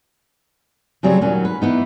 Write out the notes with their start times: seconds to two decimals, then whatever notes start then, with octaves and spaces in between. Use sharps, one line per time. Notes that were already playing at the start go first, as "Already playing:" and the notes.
1.03 C#3 F#3 G3 C4 G#4 C#5
1.21 D#2 A#2 F#3 C#4
1.45 B4
1.62 E3 B3 D#4